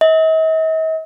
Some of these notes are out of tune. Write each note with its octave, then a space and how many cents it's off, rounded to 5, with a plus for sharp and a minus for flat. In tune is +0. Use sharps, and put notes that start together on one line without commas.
D#5 +45